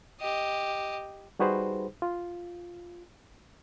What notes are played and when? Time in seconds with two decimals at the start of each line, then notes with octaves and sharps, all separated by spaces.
0.20 G4 D#5
1.39 G3 D#4 F#4 G#4 B4 C5
2.02 F4